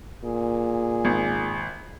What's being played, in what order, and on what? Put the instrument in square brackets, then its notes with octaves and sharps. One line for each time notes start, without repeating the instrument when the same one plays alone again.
[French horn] A#2 [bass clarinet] G#4
[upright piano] G#1